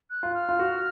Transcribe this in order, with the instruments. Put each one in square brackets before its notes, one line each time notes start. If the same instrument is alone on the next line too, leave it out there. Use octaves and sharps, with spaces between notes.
[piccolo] F#6
[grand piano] F4
[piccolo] F6
[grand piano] F4
F#4